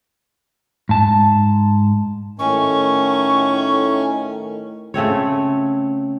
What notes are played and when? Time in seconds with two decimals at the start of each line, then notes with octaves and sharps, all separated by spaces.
0.89 G#2 A5
2.39 A2 D#3 C#4 C#6
4.94 C#3 A3 C4 C#5